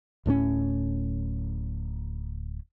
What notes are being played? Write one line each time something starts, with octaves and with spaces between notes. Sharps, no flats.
D1 A2 A3 C#4